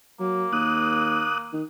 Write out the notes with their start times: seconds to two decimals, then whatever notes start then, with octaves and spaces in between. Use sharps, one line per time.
0.20 F#3 A#3
0.53 D#2 D#6 F#6
1.53 D#3